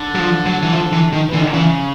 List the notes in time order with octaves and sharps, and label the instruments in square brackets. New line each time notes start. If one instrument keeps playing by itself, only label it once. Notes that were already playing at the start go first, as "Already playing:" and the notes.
Already playing: [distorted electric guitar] D3
[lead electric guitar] F#3
F3
F#3
E3
F3
E3
D#3
[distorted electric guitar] E3
[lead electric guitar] D3
[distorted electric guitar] D#3
D3
[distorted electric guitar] C#3 [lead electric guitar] E3